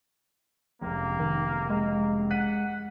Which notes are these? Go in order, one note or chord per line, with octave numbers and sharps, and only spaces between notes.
F1 C#2 A#3
D#3
G#3 A#3
F#5 F#6 B6 D#7